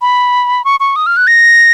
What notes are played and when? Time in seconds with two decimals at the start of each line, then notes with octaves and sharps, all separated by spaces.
0.02 B5
0.65 C#6
0.80 C#6
0.96 D#6
1.06 F6
1.17 F#6
1.27 A#6